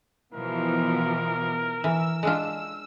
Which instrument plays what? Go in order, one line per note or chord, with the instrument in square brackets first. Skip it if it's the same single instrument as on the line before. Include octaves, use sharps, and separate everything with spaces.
[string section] B2 E3 F3 [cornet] A#4
[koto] E3 [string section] E6
[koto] G#3 D4 F4